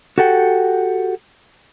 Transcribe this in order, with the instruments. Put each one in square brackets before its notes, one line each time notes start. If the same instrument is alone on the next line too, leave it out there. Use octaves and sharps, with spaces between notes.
[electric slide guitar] F#4 G4 A4 F#5 G5